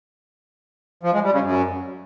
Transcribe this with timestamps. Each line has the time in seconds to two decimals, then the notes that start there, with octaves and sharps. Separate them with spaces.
1.03 F3
1.13 G#3
1.23 G3
1.33 C#3
1.42 F#2